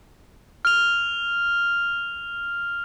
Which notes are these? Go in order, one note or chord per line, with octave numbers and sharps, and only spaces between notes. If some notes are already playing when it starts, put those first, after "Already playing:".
F6 F7